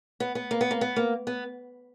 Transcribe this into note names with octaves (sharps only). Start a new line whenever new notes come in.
B3
B3
A#3
B3
A#3
B3
A#3
B3